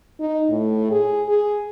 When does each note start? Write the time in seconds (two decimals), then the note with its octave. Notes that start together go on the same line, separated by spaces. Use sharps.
0.20 D#4
0.50 A2
0.91 G#4
1.28 G#4